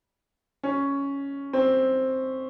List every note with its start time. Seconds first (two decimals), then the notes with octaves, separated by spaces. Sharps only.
0.63 C#4
1.53 C4